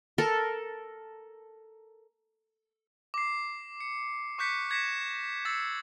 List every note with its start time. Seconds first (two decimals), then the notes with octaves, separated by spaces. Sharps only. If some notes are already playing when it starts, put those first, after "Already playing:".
0.18 A4 A#4
3.14 D6 C7
3.80 C#7
4.38 C#6 D6 F#6 G6 B6 C#7
4.71 G#6 A#6 B6 C#7 E7
5.45 D6 E6 A6 C7 C#7